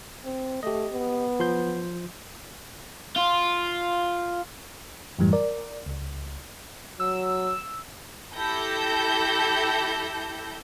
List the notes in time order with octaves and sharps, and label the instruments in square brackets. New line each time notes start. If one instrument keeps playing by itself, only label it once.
[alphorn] C4
[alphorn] A3 [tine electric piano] G4 D#5
[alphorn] B3
[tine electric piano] F3 C6 G6
[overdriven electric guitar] F4
[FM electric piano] F#2 A2 E3 G3
A#4 D5
C#2
[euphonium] F#3 [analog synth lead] E6
[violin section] E4 G4 A4 G6 A#6